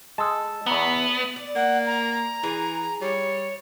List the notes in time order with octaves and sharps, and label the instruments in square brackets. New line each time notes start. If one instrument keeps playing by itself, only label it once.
[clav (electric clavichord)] G#3 [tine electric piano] A5 E6
[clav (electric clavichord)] E2 A#5 [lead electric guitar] B3
[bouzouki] D5
[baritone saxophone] A#3 [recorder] F#5
[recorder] A#5
[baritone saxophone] E3 [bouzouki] G#4
[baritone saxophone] G3 [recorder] C#5